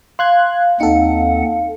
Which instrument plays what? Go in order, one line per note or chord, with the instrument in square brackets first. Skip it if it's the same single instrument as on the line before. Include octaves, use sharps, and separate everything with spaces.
[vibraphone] F5 [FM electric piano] C6 F#6 G#6
[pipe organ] D#2 C4 F#5 [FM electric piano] D#4 A4